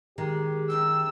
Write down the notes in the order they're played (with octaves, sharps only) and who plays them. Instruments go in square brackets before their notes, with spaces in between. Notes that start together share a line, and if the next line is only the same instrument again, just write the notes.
[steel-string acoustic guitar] D#3 [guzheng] G#3 [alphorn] G4
[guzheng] F#2 D#4 G5 [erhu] E6